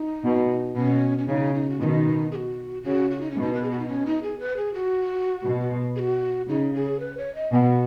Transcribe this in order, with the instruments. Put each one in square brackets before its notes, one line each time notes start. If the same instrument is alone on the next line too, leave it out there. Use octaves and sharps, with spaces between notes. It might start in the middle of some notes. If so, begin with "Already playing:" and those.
Already playing: [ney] D#4
[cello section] B2
[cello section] B2 [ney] C#4
[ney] C#4
[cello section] C#3 [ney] D#4
[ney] D#4
F#4
[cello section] B2 D#3 [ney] D#4 F#4
[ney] G#4
F#4
[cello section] C#3 [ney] F#4
[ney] F#4
D#4
C#4
[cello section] B2 [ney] D#4
[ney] B4
G#4
F#4
D#4
C#4
D#4
G#4
B4
G#4
F#4
[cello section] B2
[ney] G#4
F#4
[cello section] C#3 [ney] D#4
[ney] G#4
B4
C#5
D#5
[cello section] B2 [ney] G#5
[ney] F#5